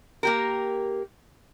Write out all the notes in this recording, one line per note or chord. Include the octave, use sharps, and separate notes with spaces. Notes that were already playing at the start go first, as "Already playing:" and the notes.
A#3 G4 A#4